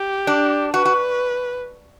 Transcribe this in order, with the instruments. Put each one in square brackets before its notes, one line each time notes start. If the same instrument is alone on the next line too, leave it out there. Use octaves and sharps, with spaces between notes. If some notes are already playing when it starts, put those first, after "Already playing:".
Already playing: [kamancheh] G4
[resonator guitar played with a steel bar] D4
[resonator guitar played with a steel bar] F#4 [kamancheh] B4
[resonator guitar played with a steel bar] F#4